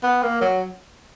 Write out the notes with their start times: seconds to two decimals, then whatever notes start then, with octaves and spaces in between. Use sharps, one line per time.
0.03 B3
0.23 A#3
0.41 F#3